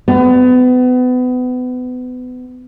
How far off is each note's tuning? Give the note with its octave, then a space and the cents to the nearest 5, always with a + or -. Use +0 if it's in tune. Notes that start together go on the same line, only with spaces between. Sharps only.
B3 +30